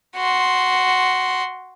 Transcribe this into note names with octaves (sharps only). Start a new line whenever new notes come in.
F#4 C6